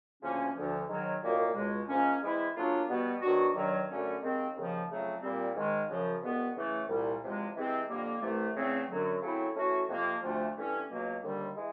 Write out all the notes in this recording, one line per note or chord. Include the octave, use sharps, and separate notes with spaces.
D2 C#3 F3 A#3 C#4
D2 D3 F3
G#2 D#3 F#3
C2 A#2 F#3 A#3 D#4
C#2 B2 G#3
G#2 F3 A#3 C#4
E3 G#3 C4 E4
C#3 F#3 A#3 D4 F4
B2 G3 B3
D#3 F#3 B3 D4 F#4
G2 D#3 F#3
F#2 D3 F#3 A3 C#4
D#2 D#3 G#3 C4
D#2 C#3 F3
F2 C#3 F#3 A3
A#2 G3 C4
G#2 D#3 G#3
F#2 C#3 F3
C2 B2 G#3 B3
C#3 E3 A3
C2 A#2 G3
E2 C3 F3 G#3
C3 E3 G#3 C4
F2 D3 G3 A#3
C2 C3 E3 A3
E2 C#3 E3 A3 C4
F#2 D3 F#3
C#3 F#3 A3 C4 E4
E3 A3 C#4 F#4
F2 C3 F3 A#3
D2 C3 F3 A3
G2 E3 A3 C#4
C#2 B2 F#3 A#3
D#2 D3 G3
E3 G#3